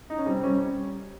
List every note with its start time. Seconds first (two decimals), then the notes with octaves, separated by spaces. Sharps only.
0.10 D#4
0.18 C#4
0.26 G3 C4
0.43 G3 C#4